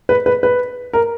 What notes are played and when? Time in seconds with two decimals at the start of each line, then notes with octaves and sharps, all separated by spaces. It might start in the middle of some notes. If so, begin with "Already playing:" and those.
0.09 B4
0.26 B4
0.43 B4
0.93 A#4